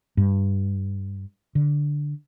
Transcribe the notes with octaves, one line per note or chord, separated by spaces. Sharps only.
G2
D3